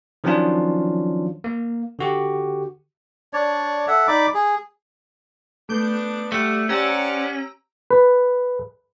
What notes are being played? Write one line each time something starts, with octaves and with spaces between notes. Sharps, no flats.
D#3 F3 F#3 C#4 D4 F4
A#3
D3 F#4 G4
D4 C#5 D5
A4 E5 F#5
D#4 D5 B5 D6
G#4
A3 B3 D4 D6 G6
G3 A3 F#4 F#6
C#4 G4 C5 D5 F#5 A#5 E6
B4